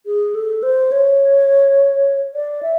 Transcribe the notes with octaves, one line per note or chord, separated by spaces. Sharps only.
G#4
A4
C5
C#5
D5
E5